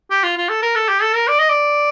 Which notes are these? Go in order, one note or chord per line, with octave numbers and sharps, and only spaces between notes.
G4
F4
F4
A4
A#4
A4
G4
A4
A#4
D5
D#5
D5